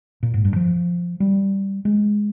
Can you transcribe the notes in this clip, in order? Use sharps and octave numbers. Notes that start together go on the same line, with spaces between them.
A#2
G#2
G2
F3
G3
G#3